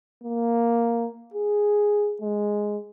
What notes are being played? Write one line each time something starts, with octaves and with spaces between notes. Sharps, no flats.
A#3
G#4
G#3